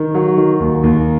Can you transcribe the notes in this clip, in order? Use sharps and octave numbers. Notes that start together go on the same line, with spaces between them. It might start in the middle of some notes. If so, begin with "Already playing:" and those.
Already playing: D#3
F#3
D#3
D#2
D#2